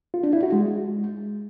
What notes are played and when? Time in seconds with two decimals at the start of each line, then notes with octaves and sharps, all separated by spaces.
0.14 F4
0.23 D4
0.33 E4
0.43 F#4
0.52 G#3